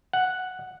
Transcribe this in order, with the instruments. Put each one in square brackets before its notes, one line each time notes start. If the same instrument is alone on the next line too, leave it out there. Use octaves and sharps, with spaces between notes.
[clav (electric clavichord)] F#5